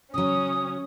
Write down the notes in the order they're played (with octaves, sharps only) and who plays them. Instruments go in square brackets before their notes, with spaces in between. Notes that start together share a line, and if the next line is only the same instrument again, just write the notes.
[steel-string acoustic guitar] C#3 F#3 [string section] C#4 [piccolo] D#6